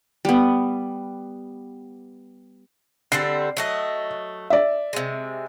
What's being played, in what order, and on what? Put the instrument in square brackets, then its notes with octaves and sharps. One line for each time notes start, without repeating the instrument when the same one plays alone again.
[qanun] G3 B3
[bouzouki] D3 G3 C4 [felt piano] C7
[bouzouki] F#3 A3 D#5
[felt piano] D5 E5
[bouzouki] C3 G#3